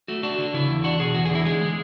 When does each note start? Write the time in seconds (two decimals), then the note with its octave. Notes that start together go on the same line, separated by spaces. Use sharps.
0.08 A3 F#4
0.23 D4 F#4
0.38 D3
0.53 C#3 E4
0.69 E2
0.84 D4 F#4
1.00 B2 G#4
1.15 E2 F#4
1.25 G#4
1.30 D3
1.35 E4
1.46 G#3 G#4
1.61 G#3